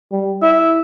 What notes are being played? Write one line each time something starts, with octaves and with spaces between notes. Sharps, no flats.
G3
E4 E5